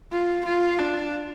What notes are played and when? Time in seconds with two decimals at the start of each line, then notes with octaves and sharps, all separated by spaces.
0.12 F4
0.45 F4
0.79 D4